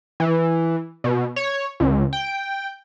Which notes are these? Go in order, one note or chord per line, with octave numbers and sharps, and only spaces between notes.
E3
B2
C#5
C#2
G5